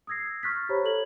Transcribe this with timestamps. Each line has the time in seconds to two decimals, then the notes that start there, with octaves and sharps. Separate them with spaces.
0.07 D#6 E6 G#6 A#6 C7
0.43 C#6 F6 F#6 A6 B6
0.69 G4 C5 C#5 A#5 B5
0.84 A4 C#5 G#6 F#7